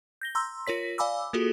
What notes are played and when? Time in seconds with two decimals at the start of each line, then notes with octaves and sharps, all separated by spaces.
0.21 G6 A#6 G7
0.35 A#5 C6 E6
0.67 F4 A#4 C#5 B6
0.98 D5 F5 G#5 B5 D6 E6
1.33 A#3 F4 F#4 G#4 A4